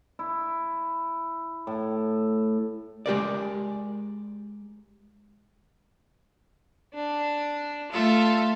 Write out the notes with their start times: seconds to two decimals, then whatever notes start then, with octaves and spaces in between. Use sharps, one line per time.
0.19 E4
1.67 A2
3.06 G#3 G4 A#4 D5
6.94 D4
7.92 A3 F4 A4 E5